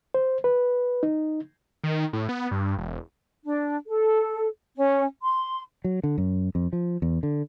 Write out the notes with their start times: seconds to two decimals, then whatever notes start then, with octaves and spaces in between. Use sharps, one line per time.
0.14 C5
0.44 B4
1.03 D#4
1.84 D#3
2.13 A2
2.29 B3
2.51 G2
2.78 E1
3.44 D4
3.88 A4
4.76 C#4
5.23 C6
5.84 F#3
6.04 D3
6.18 F#2
6.55 F2
6.73 F3
7.02 E2
7.23 D3